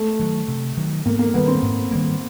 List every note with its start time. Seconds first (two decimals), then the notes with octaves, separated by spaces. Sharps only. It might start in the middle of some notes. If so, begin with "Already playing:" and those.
Already playing: A3
0.19 D#3 F#3
0.48 C3
0.77 D#3 F#3
1.06 G#2 A#3
1.19 A#3
1.34 D#3 G3 A#3 B3
1.48 C4
1.62 G#2
1.91 D#3 G3 A#3